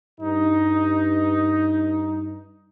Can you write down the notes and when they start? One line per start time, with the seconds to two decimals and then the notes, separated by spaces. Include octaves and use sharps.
0.20 G2 D#4